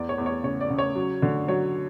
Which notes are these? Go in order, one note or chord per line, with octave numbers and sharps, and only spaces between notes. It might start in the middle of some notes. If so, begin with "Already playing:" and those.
Already playing: E2 D5
C#5
E2
C#5
C#3 C#5
D5
C#3
C#5
F#3
D3
F#3 C#5